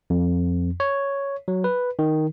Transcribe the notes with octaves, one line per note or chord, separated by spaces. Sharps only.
F2
C#5
F#3
B4
D#3